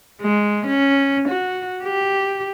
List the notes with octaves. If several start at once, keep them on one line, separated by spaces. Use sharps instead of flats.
G#3
C#4
F#4
G4